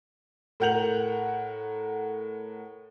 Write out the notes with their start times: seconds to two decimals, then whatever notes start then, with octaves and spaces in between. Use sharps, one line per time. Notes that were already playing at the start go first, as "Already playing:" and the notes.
0.60 A2 A#4 F#5 G6 F7 F#7